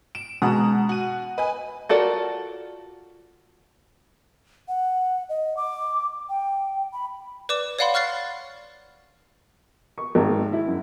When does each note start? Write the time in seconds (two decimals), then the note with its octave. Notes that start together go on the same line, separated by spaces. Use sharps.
0.15 D7 E7
0.42 B2 G#3 F#5 A#5 D#6
0.89 F#4 F#5 D#7
1.38 B4 D#5 G#5
1.89 F4 F#4 A4 A#4 D5
4.68 F#5
5.29 D#5
5.57 D6
6.29 G5
6.93 B5
7.49 B4 D5 D6 E7
7.79 C#5 D5 F5 F#5 B5 C6
7.94 C#6 F6 F#6 A6 C7
9.98 C#6
10.15 G#1
10.53 E4
10.67 F#2